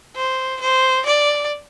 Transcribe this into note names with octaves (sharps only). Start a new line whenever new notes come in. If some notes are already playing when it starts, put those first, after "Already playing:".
C5
C5
D5